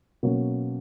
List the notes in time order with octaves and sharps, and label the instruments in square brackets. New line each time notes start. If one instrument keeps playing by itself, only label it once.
[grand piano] B2 F#3 A#3 C#4